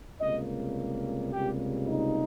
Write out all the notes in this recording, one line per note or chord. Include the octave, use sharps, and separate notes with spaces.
C#2 C3 G3 A#3 D#5
C#2 C3 G3 A#3 G4
D#4